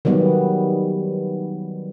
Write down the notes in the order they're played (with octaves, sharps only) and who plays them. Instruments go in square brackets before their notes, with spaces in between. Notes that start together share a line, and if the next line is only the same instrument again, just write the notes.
[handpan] D#3 F#3 G3 B3